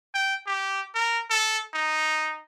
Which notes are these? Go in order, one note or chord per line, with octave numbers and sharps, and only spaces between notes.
G5
G4
A#4
A4
D#4